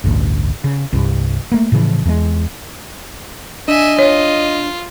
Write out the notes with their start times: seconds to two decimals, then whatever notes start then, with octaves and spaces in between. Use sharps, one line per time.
0.04 A1 D2 G2
0.64 C#3
0.93 C2 G2
1.52 A3 A#3
1.72 A2 C#3 E3 F3
2.05 E2 G#3
3.68 D4 D#5 E5 G#5
3.99 F4 C#5